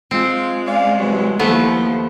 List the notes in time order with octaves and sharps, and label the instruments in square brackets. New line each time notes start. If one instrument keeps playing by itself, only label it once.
[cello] G#3 [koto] C4 [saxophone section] F4
[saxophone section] C#4 D5 F5
C3 E3 F#3
[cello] D#2 F3 [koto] A3 B3 [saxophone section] E4 A4 C5